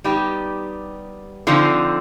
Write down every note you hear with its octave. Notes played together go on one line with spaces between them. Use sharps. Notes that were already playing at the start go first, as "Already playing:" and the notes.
G3 B3 D#4 G4
D3 F3 C4 D#4